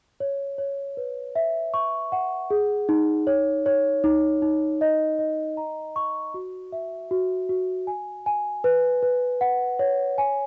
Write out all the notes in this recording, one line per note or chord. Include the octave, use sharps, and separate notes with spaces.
C#5
C#5
B4
E5
C#6
F#5
G#4
D#4
C#5
C#5
D#4
D#4
D#5
D#5
A#5
C#6
F#4
E5
F#4
F#4
G#5
G#5
B4
B4
F#5
C#5
G#5